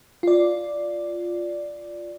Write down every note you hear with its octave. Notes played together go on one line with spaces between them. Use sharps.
F4 D5